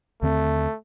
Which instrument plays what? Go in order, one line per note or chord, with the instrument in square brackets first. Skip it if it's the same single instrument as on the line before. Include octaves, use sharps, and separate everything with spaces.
[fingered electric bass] D#2 D3 C4 [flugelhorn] A3